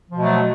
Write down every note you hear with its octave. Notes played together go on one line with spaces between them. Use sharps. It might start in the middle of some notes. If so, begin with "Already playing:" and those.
B2 F3 F#3 A3